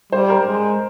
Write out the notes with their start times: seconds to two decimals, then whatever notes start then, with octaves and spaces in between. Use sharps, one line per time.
0.12 G3 C5
0.30 A#4
0.47 G#3